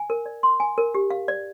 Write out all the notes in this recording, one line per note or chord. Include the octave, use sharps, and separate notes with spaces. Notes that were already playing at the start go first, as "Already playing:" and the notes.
Already playing: G#5
A#4
D5
C6
G#5
A#4
G4
F5
D5